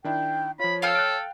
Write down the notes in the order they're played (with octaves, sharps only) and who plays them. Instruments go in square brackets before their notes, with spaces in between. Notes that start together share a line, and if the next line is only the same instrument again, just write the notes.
[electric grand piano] D#3 D4 E4 [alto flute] G5
[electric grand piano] F3 F4 [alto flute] C#5 [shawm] B5
[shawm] A4 [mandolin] F5 G5 F6
[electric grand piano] F#6 A6 D7